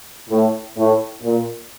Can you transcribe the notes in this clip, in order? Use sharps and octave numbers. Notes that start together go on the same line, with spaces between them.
A2
A2
A#2